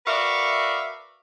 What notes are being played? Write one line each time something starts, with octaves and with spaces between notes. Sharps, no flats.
F#4 A#4 B4 D5 E5 F5